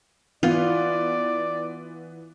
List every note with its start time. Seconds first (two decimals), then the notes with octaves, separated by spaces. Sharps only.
0.43 E3 B3 F4 D5